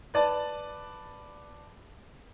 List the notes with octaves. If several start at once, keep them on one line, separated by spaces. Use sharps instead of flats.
B4 D5 A5